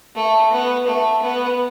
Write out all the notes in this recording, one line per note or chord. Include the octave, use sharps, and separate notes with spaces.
A3
B3
A3
B3